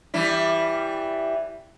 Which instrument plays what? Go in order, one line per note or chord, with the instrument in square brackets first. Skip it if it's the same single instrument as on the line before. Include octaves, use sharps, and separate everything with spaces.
[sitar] E3 G3 E4